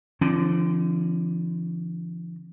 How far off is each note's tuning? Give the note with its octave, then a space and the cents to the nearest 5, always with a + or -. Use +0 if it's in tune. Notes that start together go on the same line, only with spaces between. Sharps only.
D3 +0 F3 -40 C4 +40